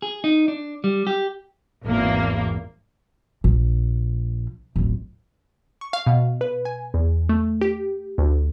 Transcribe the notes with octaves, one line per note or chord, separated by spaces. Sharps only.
G#4
D#4
D4
G3
G4
G#1 E2 A#3
A#1
D1 A1
C#6
F5
B2
B4
G#5
E2
A3
G4
D2